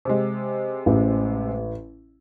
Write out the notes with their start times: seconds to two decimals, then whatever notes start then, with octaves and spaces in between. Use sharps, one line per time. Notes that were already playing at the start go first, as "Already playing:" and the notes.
0.05 C3 G#3
0.86 A1